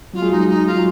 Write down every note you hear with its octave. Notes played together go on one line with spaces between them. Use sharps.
F#3 F4
G#3
F#3 D#4
D#4
G#3 F4
F#3